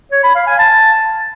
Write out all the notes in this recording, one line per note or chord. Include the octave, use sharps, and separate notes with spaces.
C#5
B5
F5
G#5
A5